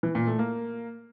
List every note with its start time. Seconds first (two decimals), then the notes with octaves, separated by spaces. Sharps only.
0.03 E3
0.15 A#2
0.27 A3
0.39 A#3